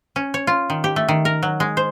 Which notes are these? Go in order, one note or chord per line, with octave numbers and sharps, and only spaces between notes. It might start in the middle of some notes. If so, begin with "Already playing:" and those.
C#4
C#5
F4
D#3
G4
A3
D#3
A#4
F#3
G#3
C5